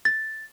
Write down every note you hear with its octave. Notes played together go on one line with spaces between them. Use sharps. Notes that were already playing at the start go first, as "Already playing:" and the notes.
A6